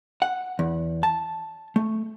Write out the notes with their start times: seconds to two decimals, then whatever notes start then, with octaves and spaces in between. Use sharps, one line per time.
0.22 F#5
0.59 E2
1.03 A5
1.76 A3